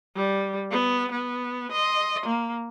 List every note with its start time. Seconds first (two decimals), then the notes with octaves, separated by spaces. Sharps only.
0.16 G3
0.71 B3
1.12 B3
1.72 D#5 C6
2.26 A#3